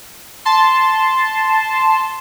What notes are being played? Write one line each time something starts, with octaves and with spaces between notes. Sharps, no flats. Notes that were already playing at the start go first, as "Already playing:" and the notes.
A5 C6